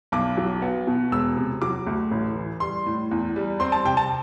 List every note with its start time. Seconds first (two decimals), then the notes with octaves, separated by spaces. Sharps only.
0.12 B1 D6
0.37 F#3
0.62 B3
0.87 B2
1.12 E1 E6
1.36 C3
1.62 F#3 D6
1.87 D2
2.11 A1
2.35 E3
2.60 G3 C6
2.86 A2
3.11 E2
3.36 G3
3.60 C4 C6
3.72 A5
3.85 C3 G5
3.97 A5